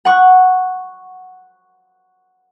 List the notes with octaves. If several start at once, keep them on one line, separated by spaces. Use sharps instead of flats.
F#5 C#6 F#6